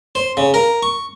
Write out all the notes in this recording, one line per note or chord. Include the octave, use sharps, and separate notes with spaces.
C5
C#3
A#4
C#6